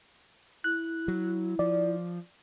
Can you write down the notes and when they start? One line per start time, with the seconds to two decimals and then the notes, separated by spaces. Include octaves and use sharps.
0.64 E4 F#6
1.08 F#3
1.59 F3 D5